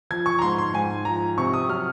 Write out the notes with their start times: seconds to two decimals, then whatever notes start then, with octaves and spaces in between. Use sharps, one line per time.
0.11 F3 G#6
0.26 C#6
0.39 A#5
0.42 G#2 C6
0.58 C6
0.74 G#2 G#5
1.05 F3 A#5
1.38 C3 C#6
1.53 D#6
1.69 F#3 F6